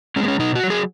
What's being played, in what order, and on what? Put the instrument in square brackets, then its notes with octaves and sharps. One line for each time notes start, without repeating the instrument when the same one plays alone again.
[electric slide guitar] G#3 C#4
B3
C#4
B2 D#4
F#4
F#3
G#4